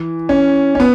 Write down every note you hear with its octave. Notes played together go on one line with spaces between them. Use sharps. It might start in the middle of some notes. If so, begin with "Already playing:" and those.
Already playing: E3
C#4
C#4
B3